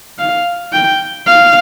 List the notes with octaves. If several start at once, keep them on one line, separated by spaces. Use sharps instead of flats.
F5
G5
F5